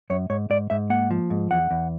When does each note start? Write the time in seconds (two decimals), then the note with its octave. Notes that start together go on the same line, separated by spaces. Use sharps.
0.10 F#2 C#5
0.30 G#2 C#5
0.50 G#2 D5
0.70 G#2 E5
0.90 A#3 F#5
1.11 F3
1.30 G#2
1.51 E2 F#5
1.71 E2